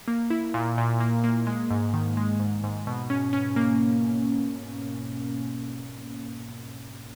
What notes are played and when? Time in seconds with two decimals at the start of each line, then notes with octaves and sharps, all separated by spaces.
0.08 A#3
0.30 E4
0.54 A#2
0.77 A#2
1.00 A#3
1.24 A#3
1.47 G#3
1.71 G#2
1.94 D#3
2.17 G#3
2.40 G#2
2.63 G#2
2.87 B2
3.10 C#4
3.33 C#4
3.56 A#3